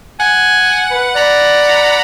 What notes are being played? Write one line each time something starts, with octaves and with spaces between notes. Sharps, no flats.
F#5 G#5
B4
D5 F#5 A#5 B5